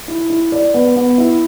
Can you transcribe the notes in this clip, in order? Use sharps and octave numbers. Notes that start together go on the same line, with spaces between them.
E4
E4
D5
B3
B3
E4